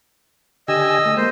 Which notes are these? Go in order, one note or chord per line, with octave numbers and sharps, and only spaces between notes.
D3 G4 D#5 G#5 E6
A3
G#3 A#3 C5